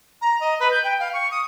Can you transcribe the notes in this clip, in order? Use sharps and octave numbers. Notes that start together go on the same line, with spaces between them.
A#5
D#5
B4
G6
G5
F5
C#6
D#6